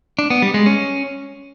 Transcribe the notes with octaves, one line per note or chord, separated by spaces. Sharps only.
D4
B3
G3
G#3
C#4